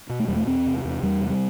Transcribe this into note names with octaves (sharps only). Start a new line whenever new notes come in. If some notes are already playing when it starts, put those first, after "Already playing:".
B2
A3
E2 G3
A3
E2 C4
C3
E2
E2 G3
C3
G3